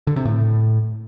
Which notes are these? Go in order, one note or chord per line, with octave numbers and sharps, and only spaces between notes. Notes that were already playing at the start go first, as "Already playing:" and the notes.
D3
C3
A2